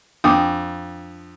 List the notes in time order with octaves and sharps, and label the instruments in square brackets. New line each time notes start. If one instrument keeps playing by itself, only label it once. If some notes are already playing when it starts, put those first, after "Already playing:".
[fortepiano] F2 D#6 [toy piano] D4 G5 D6